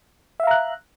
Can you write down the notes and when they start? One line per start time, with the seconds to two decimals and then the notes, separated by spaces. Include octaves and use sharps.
0.40 E5
0.43 F5
0.47 A#5
0.51 F#6